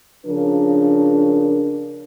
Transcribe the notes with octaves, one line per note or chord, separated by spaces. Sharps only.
C#3 F3 D4 A#4